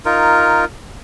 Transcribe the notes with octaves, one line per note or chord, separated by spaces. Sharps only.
D#4 F4 A#4